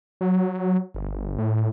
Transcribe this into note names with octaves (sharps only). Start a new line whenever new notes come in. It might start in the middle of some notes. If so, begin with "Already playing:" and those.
F#3
G1
A2